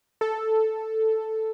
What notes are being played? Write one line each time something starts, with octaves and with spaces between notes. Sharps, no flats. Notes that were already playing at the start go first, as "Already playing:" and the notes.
A4